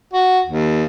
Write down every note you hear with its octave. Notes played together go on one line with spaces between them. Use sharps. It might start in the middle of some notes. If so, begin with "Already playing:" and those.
F#4
D#2